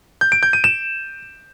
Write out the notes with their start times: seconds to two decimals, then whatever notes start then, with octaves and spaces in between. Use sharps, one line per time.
0.21 G6
0.32 D7
0.43 G6
0.53 D#7
0.64 E7